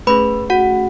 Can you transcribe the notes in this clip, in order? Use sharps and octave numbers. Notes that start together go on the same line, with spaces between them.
A3 C#4 G#4 B4 B5
F#4 F#5